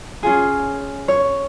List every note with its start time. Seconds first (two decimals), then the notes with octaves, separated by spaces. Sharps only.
0.23 C#4 F4 G#4
1.08 C#5